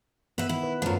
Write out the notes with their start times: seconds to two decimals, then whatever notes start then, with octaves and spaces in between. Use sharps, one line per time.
0.38 B3 B4 E5
0.49 D#3 E4
0.63 B4
0.82 F#2 F3 A3 F4